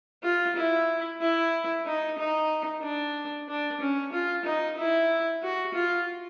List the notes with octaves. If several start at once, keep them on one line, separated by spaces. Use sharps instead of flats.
F4
E4
E4
D#4
D#4
D4
D4
C#4
F4
D#4
E4
F#4
F4